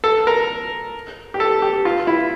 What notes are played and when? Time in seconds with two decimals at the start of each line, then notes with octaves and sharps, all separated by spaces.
0.04 A4
0.27 A#4
1.34 G4
1.40 A4
1.62 G4
1.85 F4
2.07 E4